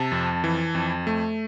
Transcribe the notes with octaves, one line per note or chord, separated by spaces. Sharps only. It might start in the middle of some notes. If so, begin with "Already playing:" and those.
Already playing: C3 A5
F2
E3
F2
A3